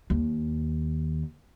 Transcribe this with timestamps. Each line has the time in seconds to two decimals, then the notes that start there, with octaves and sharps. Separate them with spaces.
0.10 D#2